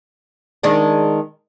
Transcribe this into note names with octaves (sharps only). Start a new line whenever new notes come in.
D#3 G#3 D4